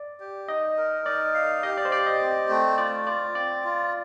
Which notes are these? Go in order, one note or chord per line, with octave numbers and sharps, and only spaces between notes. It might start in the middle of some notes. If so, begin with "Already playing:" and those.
Already playing: D5
G4
D#4 D#5
A#4
D#4 D5
F5
G4 D#5
D5
C5
G4 D5
D#5
C4
A3
F4 D5
F4 D5
C4 D5
F4